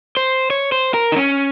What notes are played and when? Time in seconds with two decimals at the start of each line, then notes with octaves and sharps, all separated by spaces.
0.17 C5
0.50 C#5
0.72 C5
0.94 A#4
1.12 D#4
1.16 C#4